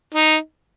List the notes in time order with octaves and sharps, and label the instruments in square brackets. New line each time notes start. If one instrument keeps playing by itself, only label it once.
[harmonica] D#4